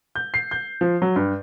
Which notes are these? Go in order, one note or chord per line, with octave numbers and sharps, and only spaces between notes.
G6
C7
G6
F3
F#3
G2